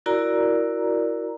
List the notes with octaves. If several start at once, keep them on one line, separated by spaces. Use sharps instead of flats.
E4 F#4 A#4 D5 A#5